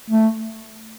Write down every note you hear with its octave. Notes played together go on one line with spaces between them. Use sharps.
A3